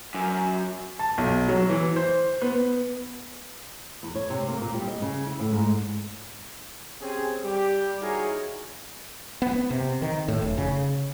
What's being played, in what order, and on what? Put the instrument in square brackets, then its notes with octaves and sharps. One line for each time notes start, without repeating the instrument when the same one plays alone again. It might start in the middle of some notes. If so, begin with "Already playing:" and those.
[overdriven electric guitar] F#2
[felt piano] A5
B1
F#3
E3
C5
B3
[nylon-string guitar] E2
C#5
C3
A#3
A#2
G3
D#5
C#3
E4
A2
G#2
[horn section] C4 C#4 G4 G#4
G3 G4
D#4 E4 F#4 G#4 A#4 C#5
[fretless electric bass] B3
C3
D#3
A2
F1
C#3